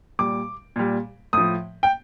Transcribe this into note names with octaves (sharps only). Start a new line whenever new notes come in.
A#2 G3 D6
A#2 G3
A2 F3 D#6
G5